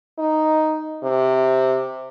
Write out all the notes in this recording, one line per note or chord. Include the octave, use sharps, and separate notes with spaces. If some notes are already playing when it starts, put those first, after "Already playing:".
D#4
C3